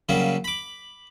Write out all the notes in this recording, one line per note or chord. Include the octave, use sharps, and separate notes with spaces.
C#3 F#3 G3 A#3
B5 D6